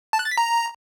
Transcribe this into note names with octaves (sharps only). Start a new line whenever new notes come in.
A5
F#6
A6
B6
A#5